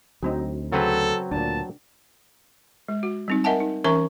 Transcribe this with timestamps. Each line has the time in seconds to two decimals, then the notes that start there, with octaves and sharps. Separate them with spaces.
0.23 D2 F#3 C4 D#4
0.72 C#3 F#3 C4 A4 B4
1.31 D2 A#2 D4 A5
2.88 G#3
3.03 F#4
3.28 G3 C4 D#4
3.44 A#4 D#5 E5 F#5 G#5 A5
3.60 D#4
3.84 E3 C#4 A#4 E5 A#5 C#6